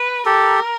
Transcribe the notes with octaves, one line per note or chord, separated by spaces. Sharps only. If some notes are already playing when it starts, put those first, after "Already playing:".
Already playing: B4
G4 A4 A#4